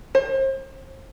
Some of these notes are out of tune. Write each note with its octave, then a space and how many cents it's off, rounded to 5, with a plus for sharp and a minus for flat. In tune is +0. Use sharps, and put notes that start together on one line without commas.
C5 +35